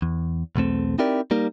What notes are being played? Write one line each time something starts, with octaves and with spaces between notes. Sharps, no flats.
E2
B1 E2 A3 C4
C4 D#4 E4 G4 A#4 D5
G3 A#3 D#4 A#4